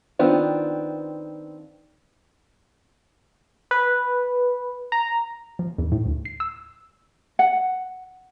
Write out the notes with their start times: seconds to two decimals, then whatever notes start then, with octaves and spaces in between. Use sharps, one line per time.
0.19 D#3 B3 C4 D4 F4
3.71 B4
4.92 A#5
5.59 F3
5.78 E2
5.92 A2
6.06 D2
6.25 C7
6.40 E6
7.39 F#5